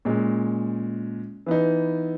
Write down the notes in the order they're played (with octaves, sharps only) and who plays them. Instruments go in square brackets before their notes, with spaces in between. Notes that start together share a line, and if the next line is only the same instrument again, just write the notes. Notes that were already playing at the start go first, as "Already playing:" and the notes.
[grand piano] A#2 G#3 C#4
E3 B3 D#4